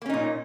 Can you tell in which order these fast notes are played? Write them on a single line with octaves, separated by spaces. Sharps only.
A#3 C#4 D#4 A#2